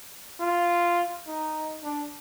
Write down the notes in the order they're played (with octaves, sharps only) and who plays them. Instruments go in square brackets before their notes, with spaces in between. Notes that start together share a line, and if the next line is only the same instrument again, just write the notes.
[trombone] F4
D#4
D4